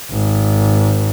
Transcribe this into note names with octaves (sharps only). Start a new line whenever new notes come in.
G#1